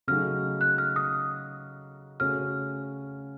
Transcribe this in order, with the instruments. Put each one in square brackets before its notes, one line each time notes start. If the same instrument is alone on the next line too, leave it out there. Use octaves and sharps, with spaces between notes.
[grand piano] C#3 F#3 A3 D#4 F#4 [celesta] F6
[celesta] F#6
F6
D#6
[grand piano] C#3 A3 C#4 F#4 [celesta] F6